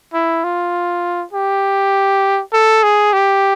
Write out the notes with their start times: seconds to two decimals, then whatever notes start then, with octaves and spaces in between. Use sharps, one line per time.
0.14 E4
0.44 F4
1.33 G4
2.53 A4
2.83 G#4
3.13 G4